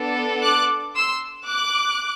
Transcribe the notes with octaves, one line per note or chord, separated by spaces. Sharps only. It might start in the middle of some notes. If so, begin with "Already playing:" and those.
Already playing: B3 D4 A4
D6 F#6
C6 E6
D6 F#6